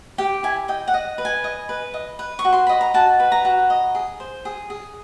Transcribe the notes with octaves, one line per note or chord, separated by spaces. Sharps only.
G4 G5
E4 G#5
D#5 G5
F#5
D#5
B4
G#5
D#5
B4
D#5
B4
C#6
F#4
C6
D#5 B5
A#5
F#4 A5
B4
A#5
F#4
D#5
G#4
C5
G#4
G#4